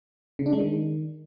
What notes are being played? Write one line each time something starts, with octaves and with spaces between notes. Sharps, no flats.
C#3
D4
G#3
D#3